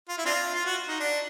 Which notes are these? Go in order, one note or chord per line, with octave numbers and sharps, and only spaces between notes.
F4
E4
C4 D4 F4
F4
F#4
D#4
D4